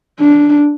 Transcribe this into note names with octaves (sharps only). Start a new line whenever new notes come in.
D4